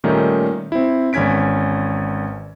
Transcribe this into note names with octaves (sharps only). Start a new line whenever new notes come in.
A#2 D#3 G3 A3 C#4 D#4
C4 E4
G#1 E2 C#4 G#6 B6 D7